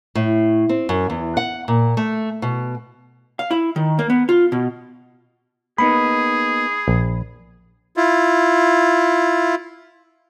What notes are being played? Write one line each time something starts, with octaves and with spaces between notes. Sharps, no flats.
A2
C4
F#2
E2
F#5
A#2
A3
B2
F5
E4
D#3
A#3
B3
F4
B2
A#3 B3 D#4 G#4 B5
A#1
E4 F4